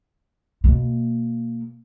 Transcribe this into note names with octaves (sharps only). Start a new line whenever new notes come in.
B2 A#3